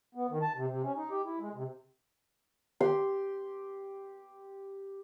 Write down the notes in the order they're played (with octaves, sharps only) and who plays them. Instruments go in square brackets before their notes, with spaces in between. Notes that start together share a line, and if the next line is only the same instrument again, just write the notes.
[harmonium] B3
D#3
A5
C3
C3
C#4
D#4
G4
E4
G#3
C3
[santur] G4 C6